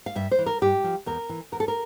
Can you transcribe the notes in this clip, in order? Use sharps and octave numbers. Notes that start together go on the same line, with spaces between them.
F5
G2 E5
C5
E3
A#4
G2 G4
F3
E2 A#4
E3
E2 A#4
A4
A#4